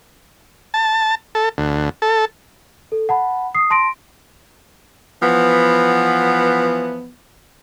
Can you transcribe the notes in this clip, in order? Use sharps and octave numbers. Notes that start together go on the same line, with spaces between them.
A5
A4
D2
A4
A4
F#5 A5 B5
D#6 C7
A5 C6 A#6 D7
E3 F3 B3